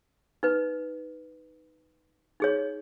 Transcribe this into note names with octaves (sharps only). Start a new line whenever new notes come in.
D#4 B4
D#4 G#4 C#5